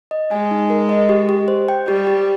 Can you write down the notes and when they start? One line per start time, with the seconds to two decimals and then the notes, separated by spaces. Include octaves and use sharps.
0.11 D#5
0.31 G#3 G#5
0.51 D#4
0.70 A#4
0.89 D#5
1.09 G4
1.29 G4
1.48 C5
1.68 G5
1.88 G3 G4
2.07 G4